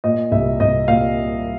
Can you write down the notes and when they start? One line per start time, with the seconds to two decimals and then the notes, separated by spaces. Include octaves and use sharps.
0.04 A#2 D#5
0.32 C2 E5
0.60 C2 D#5
0.88 A#2 F5